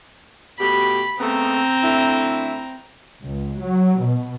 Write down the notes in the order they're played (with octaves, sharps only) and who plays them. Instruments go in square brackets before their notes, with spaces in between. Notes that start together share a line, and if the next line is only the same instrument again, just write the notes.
[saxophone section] B2 A3 G4 [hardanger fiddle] B5
[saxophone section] C#3 A3 B3 [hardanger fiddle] C4 A#5
[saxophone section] D3 A3 E4
[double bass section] C#2
F#3
B2